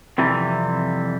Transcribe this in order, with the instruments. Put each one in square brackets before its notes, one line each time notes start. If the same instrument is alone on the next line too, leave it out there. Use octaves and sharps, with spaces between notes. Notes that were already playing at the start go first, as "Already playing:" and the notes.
[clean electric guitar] F2 C3 E3 G3